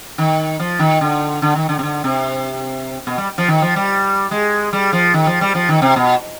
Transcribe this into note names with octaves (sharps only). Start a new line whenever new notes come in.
D#3
F3
D#3
D3
D3
D#3
D3
C3
D3
C3
B2
G3
F3
D#3
F3
G3
G#3
G3
F3
D#3
F3
G3
F3
D#3
C3
B2